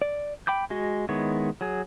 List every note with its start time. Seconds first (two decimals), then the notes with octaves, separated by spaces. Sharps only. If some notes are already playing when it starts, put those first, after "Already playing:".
0.02 D5
0.47 G5 B5 D6 G6
0.70 G#3 F#4 D#5
1.09 D#3 G#3 B3 E4 C#5
1.61 F#3 G#4